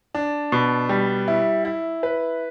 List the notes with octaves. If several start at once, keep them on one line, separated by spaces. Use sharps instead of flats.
D4
B2
G3
E4
E4
B4